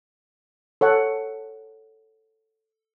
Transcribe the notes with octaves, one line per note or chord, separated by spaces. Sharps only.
A4 C#5 F#5